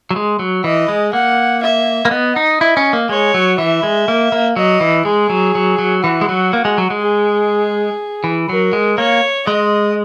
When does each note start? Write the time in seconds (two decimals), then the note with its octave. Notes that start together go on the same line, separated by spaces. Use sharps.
0.11 F#3
0.16 G#3
0.39 F#3
0.64 E3 D#5
0.88 G#3
1.13 A#3 F#5
1.63 E5
2.05 A#3
2.11 B3 D#5
2.36 D#4
2.61 E4
2.77 C#4
2.93 A#3
3.09 G#3 C#5
3.34 F#3
3.58 E3 E5
3.83 G#3
4.08 A#3
4.32 A#3
4.56 F#3 D#5
4.80 E3
5.05 G#3 G#4
5.30 F#3
5.55 F#3
5.79 F#3
6.03 E3 F#4
6.21 G#3
6.29 F#3
6.53 A#3
6.65 G#3
6.78 F#3
6.90 G#3
7.02 G#4
8.24 E3
8.49 F#3 A#4
8.73 G#3
8.97 A#3 C#5
9.47 G#3 D#5